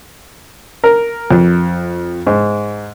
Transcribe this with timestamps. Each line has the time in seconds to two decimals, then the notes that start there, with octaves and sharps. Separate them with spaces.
0.84 A#4
1.31 F2
2.27 G#2